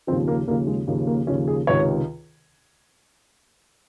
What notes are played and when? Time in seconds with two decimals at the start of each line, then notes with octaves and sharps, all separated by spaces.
0.07 D#2 C#3 F3 C4
0.28 A#3
0.47 D#2 C#3 F3 A#3
0.67 G#3
0.87 D#2 C#3 F3 A#3
1.07 A#3
1.27 D#2 C#3 F3 C#4
1.48 G#4
1.67 C#2 C3 D#3 C#5